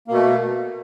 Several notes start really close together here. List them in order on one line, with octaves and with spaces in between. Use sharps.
A#3 B2 A3